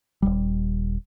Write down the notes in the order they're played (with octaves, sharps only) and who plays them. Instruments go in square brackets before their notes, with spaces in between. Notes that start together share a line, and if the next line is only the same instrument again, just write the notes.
[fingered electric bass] D#1 G#1 G3